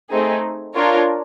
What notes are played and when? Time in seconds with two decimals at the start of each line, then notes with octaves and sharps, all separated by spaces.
0.10 A3 C4 D#4 G#4
0.74 D4 F4 A#4 C#5